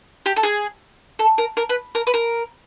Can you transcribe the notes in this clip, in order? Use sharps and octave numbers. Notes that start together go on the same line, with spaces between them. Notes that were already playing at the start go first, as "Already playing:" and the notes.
G4
A4
G#4
A4
A#4
A#4
B4
A#4
B4
A#4